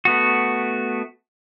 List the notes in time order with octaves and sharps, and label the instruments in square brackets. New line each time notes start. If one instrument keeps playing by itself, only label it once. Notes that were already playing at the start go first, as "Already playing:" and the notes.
[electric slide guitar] A3 B3 F#4